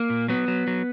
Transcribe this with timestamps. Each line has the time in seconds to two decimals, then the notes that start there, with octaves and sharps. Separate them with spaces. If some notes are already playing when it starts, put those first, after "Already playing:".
Already playing: A#3
0.10 A#2
0.28 F#3 B3
0.48 F#3
0.67 F#3